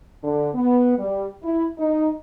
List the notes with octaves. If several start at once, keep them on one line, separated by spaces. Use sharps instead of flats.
D3
B3
G3
E4
D#4